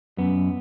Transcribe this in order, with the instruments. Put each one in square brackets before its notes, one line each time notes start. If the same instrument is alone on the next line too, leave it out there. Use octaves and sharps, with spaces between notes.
[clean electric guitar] F#2 B3